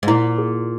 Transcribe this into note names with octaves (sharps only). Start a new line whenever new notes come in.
G#2
A#2 E4
G#4